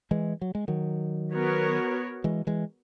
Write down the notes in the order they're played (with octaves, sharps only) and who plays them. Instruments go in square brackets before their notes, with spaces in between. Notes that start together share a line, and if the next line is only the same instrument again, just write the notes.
[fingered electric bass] E3 G#3
F#3
G#3
D#3 F#3
[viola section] B3 F#4 A#4 C#5
[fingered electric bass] E3 G#3
E3 G#3